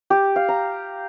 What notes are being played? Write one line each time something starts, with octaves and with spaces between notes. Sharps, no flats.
G4
F5
A#5